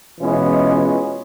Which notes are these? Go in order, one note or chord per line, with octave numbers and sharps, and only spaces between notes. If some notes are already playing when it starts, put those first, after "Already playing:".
B2 E3 G#3 B3 C#4 F4